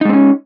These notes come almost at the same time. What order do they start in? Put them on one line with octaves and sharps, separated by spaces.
D#4 G#3 C4 C#4